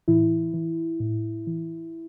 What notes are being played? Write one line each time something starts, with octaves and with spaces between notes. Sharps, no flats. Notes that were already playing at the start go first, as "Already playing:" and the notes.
A2 E3 E4
E3
A2
E3